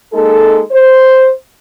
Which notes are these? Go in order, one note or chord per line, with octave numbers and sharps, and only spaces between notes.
G#3 A#3 D#4 A4
C5